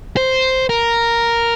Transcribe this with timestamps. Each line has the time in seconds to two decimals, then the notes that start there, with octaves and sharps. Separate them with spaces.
0.17 C5
0.69 A#4